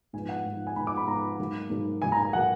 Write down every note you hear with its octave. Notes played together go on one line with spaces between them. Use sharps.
G#2 F3 B3 G#5
F#5
G#2 F3 B3
G#5
G#2 F3 B3 B5
D6
B5
G#2 F3 B3 A#5
G#2 F#3 A#3
G#2 F#3 A#3
G#2 F#3 A#3 G#5
A#5
G#5
F#3 A#3 F#5